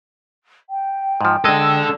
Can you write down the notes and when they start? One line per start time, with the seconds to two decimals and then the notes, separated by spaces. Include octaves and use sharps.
0.70 G5
1.21 G#2 F3
1.44 G#3 D4 A4 D#5 E6